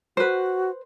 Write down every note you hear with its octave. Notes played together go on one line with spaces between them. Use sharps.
F#4 B4 C5